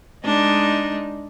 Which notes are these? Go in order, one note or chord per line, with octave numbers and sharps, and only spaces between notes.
G#3 D4 D#4